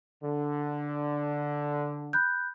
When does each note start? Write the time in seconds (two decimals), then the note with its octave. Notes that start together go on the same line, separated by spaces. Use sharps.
0.22 D3
2.13 B5 F#6 G6